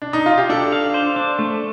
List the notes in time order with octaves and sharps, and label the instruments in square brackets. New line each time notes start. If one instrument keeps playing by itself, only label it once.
[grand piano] D4
D#4
F4
G4
[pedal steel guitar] D4 [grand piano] A4
[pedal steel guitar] F5
C5
D4
A3